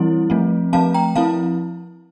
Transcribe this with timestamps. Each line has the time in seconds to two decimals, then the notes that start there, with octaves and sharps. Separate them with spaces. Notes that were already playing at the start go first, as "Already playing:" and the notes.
Already playing: E3 G3 C4 E4
0.30 F3 A3 C4
0.73 F3 A3 C4 F5 A5
0.94 G5 A#5
1.16 F3 C4 E4 F5 A5